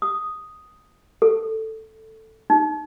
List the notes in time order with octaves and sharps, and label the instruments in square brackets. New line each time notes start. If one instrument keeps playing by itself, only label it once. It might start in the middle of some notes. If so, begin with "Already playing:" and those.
[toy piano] D#6
A4
D#4